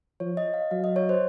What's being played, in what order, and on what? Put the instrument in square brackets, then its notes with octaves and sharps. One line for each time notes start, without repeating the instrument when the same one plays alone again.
[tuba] F3 [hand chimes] C#5
[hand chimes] D#5
F5
[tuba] F#3 [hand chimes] F5
[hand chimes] D#5
C#5
C5